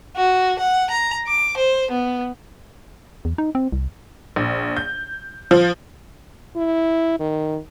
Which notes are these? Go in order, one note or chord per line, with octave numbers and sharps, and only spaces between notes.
F#4
F#5
A#5
D6
C5
B3
E2
D#4
C4
C2
A#1
G6
F3
E4
D#3